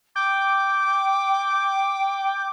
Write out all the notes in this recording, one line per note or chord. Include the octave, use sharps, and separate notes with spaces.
G5 D6